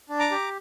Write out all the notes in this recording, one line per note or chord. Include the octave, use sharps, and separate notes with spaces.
D4
A#5 D6
G4